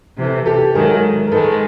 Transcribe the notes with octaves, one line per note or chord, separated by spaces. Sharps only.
C3 E3 A3
G4 A4
G#2 D#3 F#3 A3 G#4 A#4
A#4
G#2 D#3 G#3 A4 B4